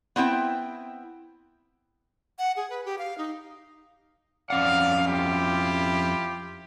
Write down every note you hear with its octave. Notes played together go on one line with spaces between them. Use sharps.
B3 C4 E4 G5
F#5
G#4
B4
G4
F5
D#4
F2 C#4 D5 F5 F#5
E4 F4 G4